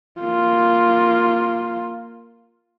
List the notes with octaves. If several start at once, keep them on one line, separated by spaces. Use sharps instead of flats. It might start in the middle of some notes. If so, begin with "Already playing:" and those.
A#3 F4